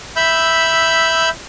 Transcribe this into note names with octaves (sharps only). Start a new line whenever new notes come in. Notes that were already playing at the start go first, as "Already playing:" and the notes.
E5 B5 E6 G6